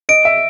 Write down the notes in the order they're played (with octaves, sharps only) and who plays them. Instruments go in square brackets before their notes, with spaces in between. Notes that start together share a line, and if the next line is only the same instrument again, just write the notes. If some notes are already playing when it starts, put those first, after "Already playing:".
[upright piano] D#5 [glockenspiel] D7
[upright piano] E5